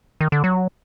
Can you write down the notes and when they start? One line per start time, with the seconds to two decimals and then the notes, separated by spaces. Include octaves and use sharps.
0.21 D#3
0.32 D3
0.44 F#3